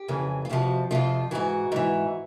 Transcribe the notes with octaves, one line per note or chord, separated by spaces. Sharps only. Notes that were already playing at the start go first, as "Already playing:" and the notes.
Already playing: G4
F2 C#3 E3
F4
F2 C3 F3 F#4
F2 C3 F3 F4
G#2 E3 F#4
G#2 E3